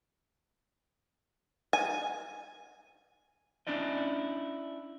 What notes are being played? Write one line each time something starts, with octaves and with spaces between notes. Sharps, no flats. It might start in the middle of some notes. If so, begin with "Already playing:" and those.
G#5
C#4 D4 E4 D5 D#5